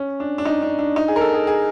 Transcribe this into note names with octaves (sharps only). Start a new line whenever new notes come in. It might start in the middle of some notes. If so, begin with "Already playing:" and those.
Already playing: C#4
D4
D4
D#4
D4
D4
D#4
G#4
A#4
A4
G#4
G#4